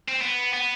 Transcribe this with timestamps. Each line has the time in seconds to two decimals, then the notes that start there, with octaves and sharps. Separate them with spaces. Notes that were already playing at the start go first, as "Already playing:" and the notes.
0.08 C4
0.21 B3
0.53 B3